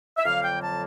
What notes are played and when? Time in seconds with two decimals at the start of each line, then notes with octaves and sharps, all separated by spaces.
0.17 E5
0.24 F2 D3 F#3 A#3 F5
0.44 G5
0.62 A5